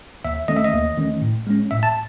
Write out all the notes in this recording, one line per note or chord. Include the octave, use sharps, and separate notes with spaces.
D#2 E5
D#3 A3 C#4 D#5
E5
D#5
D#2
D#3 A3 C#4
A2
G#3 C#4
A2 E5
A5